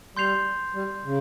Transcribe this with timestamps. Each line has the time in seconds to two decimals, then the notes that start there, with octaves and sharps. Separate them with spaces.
0.16 G3 C6 G6 C7 F7
0.74 G3
1.05 C#3